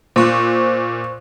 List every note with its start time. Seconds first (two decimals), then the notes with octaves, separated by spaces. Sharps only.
0.16 A#2 C5 C#6 F#6